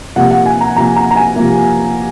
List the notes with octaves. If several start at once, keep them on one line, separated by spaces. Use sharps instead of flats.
C3 F3 A#3 F#5
F#5
G#5
A#5
C3 F3 A#3 A#5
A#5
A#5
G#5
C3 F3 A#3